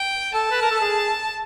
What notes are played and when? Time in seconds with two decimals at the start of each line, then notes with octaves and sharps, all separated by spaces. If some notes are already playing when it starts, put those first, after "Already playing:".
Already playing: G5
0.34 A4 A5
0.51 B4
0.62 A#4
0.71 A4
0.81 G#4